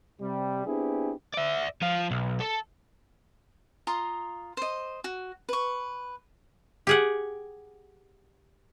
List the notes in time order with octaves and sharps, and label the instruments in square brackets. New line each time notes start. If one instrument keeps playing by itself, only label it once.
[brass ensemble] C3 G3
B3 C4 D4 E4 G4 G#4
[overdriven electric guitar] D5 E5
F3 F5
B1
A4
[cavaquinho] F4 A#5 C6 D#6
C5 D#5
F#4
B4 C#6
[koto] G4 G#4 F#5